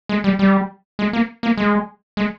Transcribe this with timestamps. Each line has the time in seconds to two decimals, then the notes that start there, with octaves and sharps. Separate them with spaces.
0.09 G#3
0.24 G3
0.39 G3
0.99 G#3
1.13 A#3
1.43 A#3
1.58 G#3
2.17 G#3